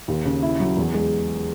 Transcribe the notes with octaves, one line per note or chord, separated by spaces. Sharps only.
D#2
C#3
E4
F#3
E2
G#3